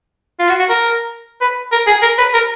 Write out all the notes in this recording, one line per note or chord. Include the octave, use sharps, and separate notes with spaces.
F4
F#4
F#4
A#4
B4
A#4
G#4
A#4
B4
A#4